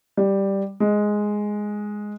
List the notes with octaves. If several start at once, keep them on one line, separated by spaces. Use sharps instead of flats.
G3
G#3